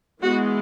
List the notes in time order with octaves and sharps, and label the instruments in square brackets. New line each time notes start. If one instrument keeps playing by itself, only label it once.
[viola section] E3 G#3 B3 F#4